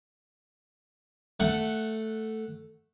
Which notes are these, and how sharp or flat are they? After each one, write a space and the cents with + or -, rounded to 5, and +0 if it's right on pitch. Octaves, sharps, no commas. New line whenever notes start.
A3 +0 F#5 +0